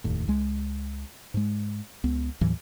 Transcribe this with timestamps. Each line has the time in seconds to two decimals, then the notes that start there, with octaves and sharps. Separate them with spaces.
0.04 F1 D#2 A2
0.28 C#2 G#3
1.34 G#2 G#3
2.04 C#2 B3
2.41 D#2 A2 E3 F#3